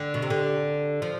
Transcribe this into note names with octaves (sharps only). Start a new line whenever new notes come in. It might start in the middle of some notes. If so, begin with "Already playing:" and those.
Already playing: D3
B2
C3
D3
F3